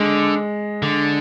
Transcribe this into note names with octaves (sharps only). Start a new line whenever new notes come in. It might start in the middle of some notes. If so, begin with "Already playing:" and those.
Already playing: D3 G#3
D3